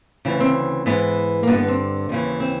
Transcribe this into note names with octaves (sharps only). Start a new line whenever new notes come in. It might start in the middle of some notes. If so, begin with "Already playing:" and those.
D2 C#3 E3
C4
G#2 E3 B3
A#3
G2 D3 B3
B3
C4
D#2 C#3 E3
C4